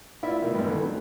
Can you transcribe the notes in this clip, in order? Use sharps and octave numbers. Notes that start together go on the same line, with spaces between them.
E4 F4 D5 E5
B2 D#3
G#1 G2
D3 E3
F#3